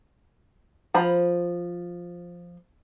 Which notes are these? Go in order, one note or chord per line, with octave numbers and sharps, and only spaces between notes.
F3 C5 A#5 B5